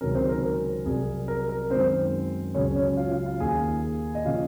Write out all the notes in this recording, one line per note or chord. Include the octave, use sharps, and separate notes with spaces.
C#2 C3 D#3 F#3 C#4 A#4
C4 C5
A#4
A#4
C2 C3 F#3 G#4
A#4
A#4
F#2 D#3 G#3 C4 C5
C#2 C#3 F#3 C#4 C#5
C#4 C#5
F4 F5
F4 F5
F4 F5
D#2 D#3 A#3 C#4 G#4 G#5
D#5
C#3 F3 A#3 C#4 F4 F5